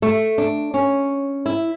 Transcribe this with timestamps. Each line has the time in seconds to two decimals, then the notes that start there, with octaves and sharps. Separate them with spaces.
0.02 A3
0.38 D4
0.74 C#4
1.46 E4